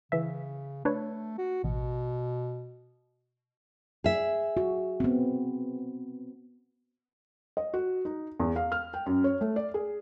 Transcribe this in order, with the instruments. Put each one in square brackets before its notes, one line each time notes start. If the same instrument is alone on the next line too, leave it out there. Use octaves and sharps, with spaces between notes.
[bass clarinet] C#3 [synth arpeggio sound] E3 E5
[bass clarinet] A3 [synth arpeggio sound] D4 B4 C#5
[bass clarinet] F#4
[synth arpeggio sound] A1 [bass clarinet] B2
[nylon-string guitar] G#4 E5
[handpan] F#4
B3 C4
[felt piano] D#5
F#4
D#4
E2
F5
F6
G5
F#2
C#5
A3
D5
G#4